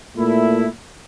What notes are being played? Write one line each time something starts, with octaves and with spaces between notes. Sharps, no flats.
A#2 A3 E4